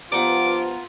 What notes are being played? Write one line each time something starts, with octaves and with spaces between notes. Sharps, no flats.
G2 F3 B3 F4 F#5 A#5 D6